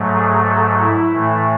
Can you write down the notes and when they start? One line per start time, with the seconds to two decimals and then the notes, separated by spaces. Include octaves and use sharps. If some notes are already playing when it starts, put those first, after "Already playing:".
Already playing: G#2 F#3 A3
0.15 G#4
0.48 A4
0.80 E4
1.12 A2 E3 A3